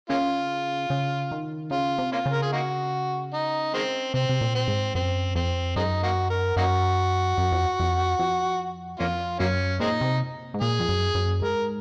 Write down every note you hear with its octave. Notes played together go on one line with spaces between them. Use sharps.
C#3 A#3 C#4 F4
C#3
D#3
C#3 F4
C3
A#3 C#4 F4
C#3
A#4
G#4
A#3 D#4 F#4
D#4
D#3 G#3 C4
C3 C4
C3
A#2
C4
G#2
F#2 C4
F2 C4
F#2 G#3 C4 D#4
A#3 D#4 F#4
A#4
F#2 A#3 D#4 F#4
F#2
F2
F2
F2
F2 A#3 C#4 F4
F#2 F#3 A#3 C#4
A#2 G#3 C4 D#4
C3
G#2
A#2 G#4
F2
F#2
F#2
G#2 A#4